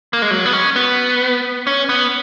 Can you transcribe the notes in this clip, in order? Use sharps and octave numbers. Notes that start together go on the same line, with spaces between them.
A#3
G#3
F#3
B3
C#4
B3
C#4
B3